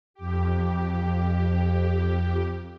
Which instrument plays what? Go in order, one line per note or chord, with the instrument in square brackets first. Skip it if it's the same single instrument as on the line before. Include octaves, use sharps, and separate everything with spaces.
[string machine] F2 G4